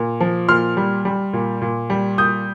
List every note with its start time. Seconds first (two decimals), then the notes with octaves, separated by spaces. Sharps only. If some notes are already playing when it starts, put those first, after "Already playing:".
Already playing: A#2
0.20 F3
0.48 A#2 C6 F6
0.77 G3
1.05 G3
1.33 A#2
1.62 A#2
1.90 G3
2.18 A#2 D#6 G6